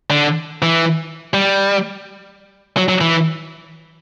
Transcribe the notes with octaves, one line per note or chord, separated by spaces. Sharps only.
D3
E3
G3
F#3
F#3
E3